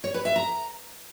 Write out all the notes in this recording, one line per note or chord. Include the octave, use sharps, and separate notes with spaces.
C#5
B4
E5
A#5